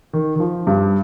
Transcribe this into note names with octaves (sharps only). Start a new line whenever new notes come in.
D#3
D#3
F3
G2 G3